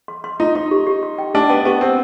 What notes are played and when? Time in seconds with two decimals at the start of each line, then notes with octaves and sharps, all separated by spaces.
0.08 C6
0.24 C6
0.40 D#4 F4
0.55 D#4 C6
0.71 G4
0.87 G4
1.03 C6
1.18 G5
1.34 D4 G4
1.50 B3 G5
1.65 B3 G4
1.81 C4 G5